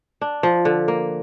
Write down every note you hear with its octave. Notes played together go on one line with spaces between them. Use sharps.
D4
F3
D3
A#3